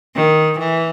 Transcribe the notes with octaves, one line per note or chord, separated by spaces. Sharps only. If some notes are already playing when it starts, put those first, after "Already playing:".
D#3
E3